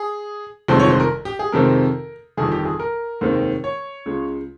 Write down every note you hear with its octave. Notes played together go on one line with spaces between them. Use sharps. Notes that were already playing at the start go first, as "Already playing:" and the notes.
Already playing: G#4
G1 F2 C3 D#3 G#3 C5
C#5
C5
A#4
G4
G#4
F2 C3 D#3 G#3 C4 A#4
G1 F2 D#3 G#4
G4
G#4
A#4
F1 D#2 D#3 G#3 C4
C#5
C#2 C#3 G#3